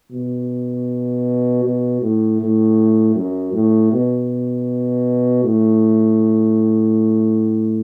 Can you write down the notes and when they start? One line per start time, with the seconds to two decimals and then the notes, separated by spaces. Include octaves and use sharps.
0.12 B2
1.64 B2
2.02 A2
2.41 A2
3.16 F#2
3.53 A2
3.93 B2
5.44 A2